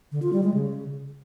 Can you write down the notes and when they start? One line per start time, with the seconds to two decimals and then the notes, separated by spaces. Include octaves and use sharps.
0.12 D3
0.22 F4
0.33 G3
0.43 G#3
0.54 C#3